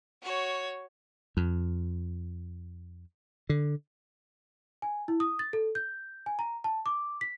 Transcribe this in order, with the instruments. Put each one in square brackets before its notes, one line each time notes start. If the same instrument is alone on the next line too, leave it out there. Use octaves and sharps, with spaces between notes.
[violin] F#4 C#5
[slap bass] F2
D3
[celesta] G#5
E4
D#6
A6
A4
G6
G#5
A#5
A5
D6
B6